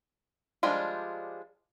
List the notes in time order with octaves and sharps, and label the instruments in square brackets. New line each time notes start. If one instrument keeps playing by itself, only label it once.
[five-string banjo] F3 G3 G#3 D4 F4